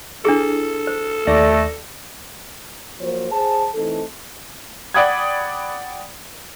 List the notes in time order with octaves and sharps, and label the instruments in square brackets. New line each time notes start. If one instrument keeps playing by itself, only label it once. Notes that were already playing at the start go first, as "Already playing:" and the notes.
[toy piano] D4 E4 G#4 [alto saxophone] A4
[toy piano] C5
[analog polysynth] D#2 D5 A#6 [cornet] A3
[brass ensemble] F3 F#3 A#3 C5 C#5
G#4 C5 A5
E3 A3 C4 D#4 A4
[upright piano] D5 F#5 G5 B5 D#6 G#6